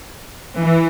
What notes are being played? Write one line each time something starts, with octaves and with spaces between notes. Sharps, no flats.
E3